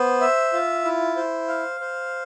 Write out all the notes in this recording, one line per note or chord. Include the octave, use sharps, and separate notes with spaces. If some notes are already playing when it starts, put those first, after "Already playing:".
Already playing: B3 C5
E5
F4
E4
C5
F5
C5